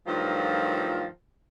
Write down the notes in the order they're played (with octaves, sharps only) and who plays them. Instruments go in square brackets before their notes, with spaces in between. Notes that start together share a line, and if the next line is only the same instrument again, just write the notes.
[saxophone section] G2 D#3 F3 F#3 A3 F4